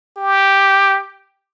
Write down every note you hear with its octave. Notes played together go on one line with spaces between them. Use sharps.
G4